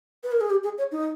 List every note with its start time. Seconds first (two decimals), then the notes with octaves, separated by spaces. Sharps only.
0.24 B4
0.32 A#4
0.41 G#4
0.50 G4
0.64 G#4
0.78 C#5
0.92 D#4